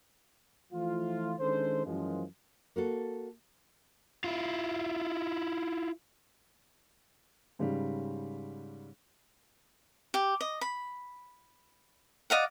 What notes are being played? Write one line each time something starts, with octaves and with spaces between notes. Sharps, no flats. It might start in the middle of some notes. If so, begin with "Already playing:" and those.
E3 F3 A3 E4 F4
D#3 G#3 C#4 D4 A4 C5
F#2 E3 F3 G#3
A#3 F#4 A4
E4 F4
G#2 C#3 G3
G4
D#5
B5
D5 D#5 F5 F#5